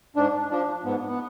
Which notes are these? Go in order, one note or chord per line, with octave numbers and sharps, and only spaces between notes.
G#2 D4
F3 D4
G#2 B3
B3